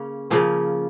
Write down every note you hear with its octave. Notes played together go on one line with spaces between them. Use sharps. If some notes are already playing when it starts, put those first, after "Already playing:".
Already playing: C#3 A#3 C#4
C#3 F3 A#3 C#4